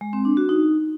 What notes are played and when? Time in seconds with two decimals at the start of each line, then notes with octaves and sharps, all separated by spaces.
0.01 G#3
0.13 C4
0.25 D4
0.37 F#4
0.49 D#4